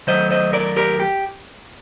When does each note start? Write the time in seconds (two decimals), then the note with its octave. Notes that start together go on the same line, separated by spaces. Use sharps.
0.07 D#3 F#3 A3 C5 D#5
0.30 C5 D#5
0.53 A#4 D5
0.77 G4 A#4
1.00 G4